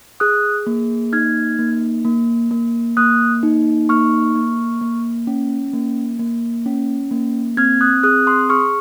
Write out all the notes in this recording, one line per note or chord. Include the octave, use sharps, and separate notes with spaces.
G#4 D#6 F#6
A#3
D#4 F6 G#6
A#3
A#3
A#3
A#3 D#6 F#6
D#4
A#3 C#6 F6
A#3
A#3
C#4
A#3
A#3
C#4
A#3
C4 F6 G#6
D#6 F#6
G#4 D#6 F#6
C6 D#6
G#4 C#6 F6